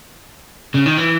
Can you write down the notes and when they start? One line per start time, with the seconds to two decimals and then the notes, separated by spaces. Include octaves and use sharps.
0.74 C#3
0.86 D#3
0.97 E3